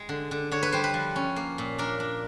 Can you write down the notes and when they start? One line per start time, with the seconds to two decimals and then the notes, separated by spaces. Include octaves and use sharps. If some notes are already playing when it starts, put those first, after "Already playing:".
Already playing: G#3
0.09 D3
0.31 D3
0.51 D3 C#5
0.63 B4
0.72 G3 C5
0.84 B4
0.94 F3
1.16 C#4
1.36 A#3
1.58 A#2
1.78 D4 A#4
2.00 D4